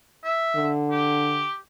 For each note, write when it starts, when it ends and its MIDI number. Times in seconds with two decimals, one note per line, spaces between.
0.24 0.70 76
0.56 1.46 50
0.91 1.56 67